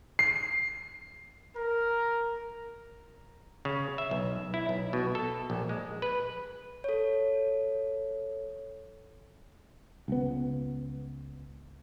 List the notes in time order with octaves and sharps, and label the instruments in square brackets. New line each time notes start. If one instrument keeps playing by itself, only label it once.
[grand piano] C7
[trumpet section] A#4
[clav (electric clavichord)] C#3
E5
B1
E4
B1
B2
A4
A#1
G#3
B4
[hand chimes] A4 C#5
[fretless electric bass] C#2 B3